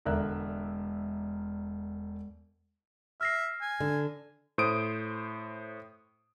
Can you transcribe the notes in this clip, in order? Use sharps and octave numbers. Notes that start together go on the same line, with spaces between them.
E1 D3 A#4 D5 E5 F#6
E5 F6 A#6 C7
G#5
D3
A2 C5 D#6 D7